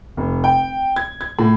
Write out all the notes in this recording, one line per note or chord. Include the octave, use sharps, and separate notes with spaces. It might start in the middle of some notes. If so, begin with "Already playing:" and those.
F1
G5
G#6
G#6
A2